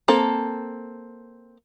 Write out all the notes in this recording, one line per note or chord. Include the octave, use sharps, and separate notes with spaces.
A#3 C4 A4